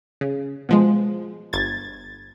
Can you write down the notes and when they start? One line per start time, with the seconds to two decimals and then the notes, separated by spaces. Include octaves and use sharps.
0.21 C#3
0.69 B2 F3 G#3
1.53 G1 G#6 A6